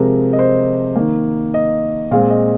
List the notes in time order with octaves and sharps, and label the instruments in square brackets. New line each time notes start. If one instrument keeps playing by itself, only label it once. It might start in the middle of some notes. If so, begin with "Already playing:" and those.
Already playing: [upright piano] C3 F3 G#3 C4 A#4
D#5
C5
D#3 A#3
D#5
A#2 G#3 C4 F5
D#5